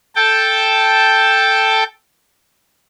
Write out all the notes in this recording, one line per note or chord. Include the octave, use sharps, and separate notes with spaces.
A4 G5 A5